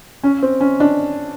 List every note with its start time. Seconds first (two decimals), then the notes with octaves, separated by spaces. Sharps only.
0.24 C#4
0.42 C4
0.60 C#4
0.80 D4